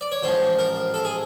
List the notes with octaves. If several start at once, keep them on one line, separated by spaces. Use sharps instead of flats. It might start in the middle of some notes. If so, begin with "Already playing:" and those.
D5
C#5
A1 G#2 F3 C5
A#4
A4
G#4